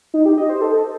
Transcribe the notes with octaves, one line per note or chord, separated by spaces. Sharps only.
D#4
G4
D#5
C5
A4